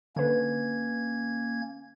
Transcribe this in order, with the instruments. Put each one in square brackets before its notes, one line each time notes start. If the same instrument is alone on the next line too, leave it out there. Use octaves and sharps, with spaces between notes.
[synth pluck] D3 B4 [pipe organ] A#3 C#4 G#6